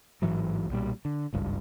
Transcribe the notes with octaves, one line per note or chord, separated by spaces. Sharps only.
A1 G#2 E3 F#3
B1 A#2 G3
D3
G#1 C#2 G2